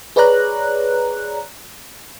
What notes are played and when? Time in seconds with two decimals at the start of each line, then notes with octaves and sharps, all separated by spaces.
0.16 G#4 B4 C#5 D5 A#5 F#6